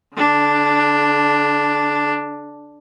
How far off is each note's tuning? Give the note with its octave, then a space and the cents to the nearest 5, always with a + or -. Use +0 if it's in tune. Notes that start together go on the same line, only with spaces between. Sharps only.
D3 -35 D4 +0